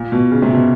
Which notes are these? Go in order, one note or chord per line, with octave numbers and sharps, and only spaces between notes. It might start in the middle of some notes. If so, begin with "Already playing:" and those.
Already playing: A#2
B2
C#3
C3
B2